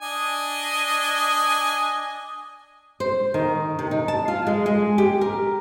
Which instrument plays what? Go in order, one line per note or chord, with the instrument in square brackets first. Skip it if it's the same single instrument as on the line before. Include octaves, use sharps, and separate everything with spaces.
[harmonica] D4 D#5 G#5
[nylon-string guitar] C5
D#3
C3
D#4
A5
F4
G#3
G#3
G4
A#4